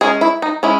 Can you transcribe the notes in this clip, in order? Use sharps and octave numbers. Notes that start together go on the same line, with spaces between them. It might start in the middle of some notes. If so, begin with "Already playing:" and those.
G#3 C#4 G#4
E4
D#4
G#3 C#4 E4